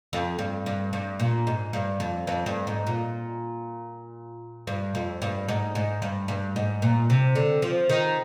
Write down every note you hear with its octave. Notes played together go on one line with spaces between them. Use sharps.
F2
G2
G2
G2
A#2
G#2
G2
F2
F2
G2
G#2
A#2
G2
F2
G2
G#2
G#2
G2
G2
G#2
A#2
C3
D3
F3
D#3